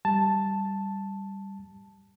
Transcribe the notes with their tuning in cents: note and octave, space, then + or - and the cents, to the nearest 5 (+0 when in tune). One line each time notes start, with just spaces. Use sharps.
G3 +0 A5 +0